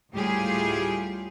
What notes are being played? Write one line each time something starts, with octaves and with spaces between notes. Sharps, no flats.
D2 A2 G3 F4 G4 G#4